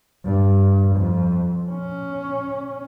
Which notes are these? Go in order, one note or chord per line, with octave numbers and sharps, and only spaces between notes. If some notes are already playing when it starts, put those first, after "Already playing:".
G2
F2
C#4